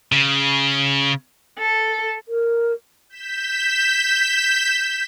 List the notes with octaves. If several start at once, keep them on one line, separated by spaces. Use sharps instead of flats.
C#3
A4
A#4
G6 B6 E7